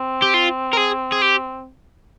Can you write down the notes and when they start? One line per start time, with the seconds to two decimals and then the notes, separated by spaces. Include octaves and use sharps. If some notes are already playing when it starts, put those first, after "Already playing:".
Already playing: C4
0.22 G4
0.34 F4
0.73 A#4
0.77 G#4
1.12 G#4
1.22 G4